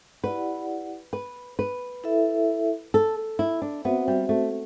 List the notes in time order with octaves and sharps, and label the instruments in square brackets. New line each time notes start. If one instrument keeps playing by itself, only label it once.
[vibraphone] E4 G4 D5 F#5 [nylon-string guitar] B4
[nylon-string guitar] B4
B4
[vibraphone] E4 A4 E5
[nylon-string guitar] A4
E4
D4
[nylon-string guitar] B3 [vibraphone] C4 F#4 C5 E5
[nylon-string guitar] G3
A3